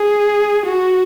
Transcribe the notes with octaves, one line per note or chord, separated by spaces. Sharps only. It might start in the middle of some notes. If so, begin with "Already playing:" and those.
Already playing: G#4
F#4